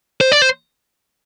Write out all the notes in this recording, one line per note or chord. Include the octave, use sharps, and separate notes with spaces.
C5
D5
C5